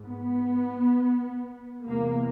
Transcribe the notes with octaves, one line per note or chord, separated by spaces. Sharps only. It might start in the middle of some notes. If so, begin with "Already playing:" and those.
Already playing: G#2
B3
E2 C3 A#3